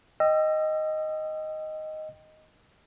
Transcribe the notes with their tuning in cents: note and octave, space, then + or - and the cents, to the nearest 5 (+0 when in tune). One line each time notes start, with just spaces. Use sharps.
D#5 +0 G5 +0 E6 +30